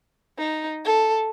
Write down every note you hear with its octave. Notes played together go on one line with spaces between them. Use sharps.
D#4
A4